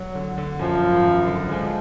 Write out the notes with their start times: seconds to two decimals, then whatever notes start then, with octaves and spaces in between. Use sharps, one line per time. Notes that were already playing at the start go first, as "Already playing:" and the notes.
Already playing: F#3
0.15 D3
0.38 D3
0.59 F#2 F3
0.83 G#1
1.05 F#2
1.27 D3
1.48 F3 G#3